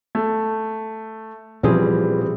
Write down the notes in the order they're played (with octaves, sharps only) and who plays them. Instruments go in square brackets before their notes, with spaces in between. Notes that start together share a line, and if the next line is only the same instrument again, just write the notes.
[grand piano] A3
[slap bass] A#2 C#4 [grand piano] E3 G3 C4 [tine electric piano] F3 G#4